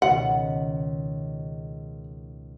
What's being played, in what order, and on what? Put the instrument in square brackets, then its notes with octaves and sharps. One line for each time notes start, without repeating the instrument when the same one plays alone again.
[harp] C#2 B2 D#3 [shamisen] F#5